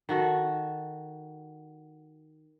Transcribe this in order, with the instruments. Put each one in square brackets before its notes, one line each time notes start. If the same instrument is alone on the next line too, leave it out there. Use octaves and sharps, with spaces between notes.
[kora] D#3 F#4 A4